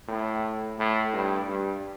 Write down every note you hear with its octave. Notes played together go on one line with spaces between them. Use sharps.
A2
A2
G2
G2